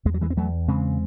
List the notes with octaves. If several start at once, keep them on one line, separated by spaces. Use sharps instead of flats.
E2 G#3
F#3
E3 G#3
C4
E2 F#3 A3
C#3 G#3 C4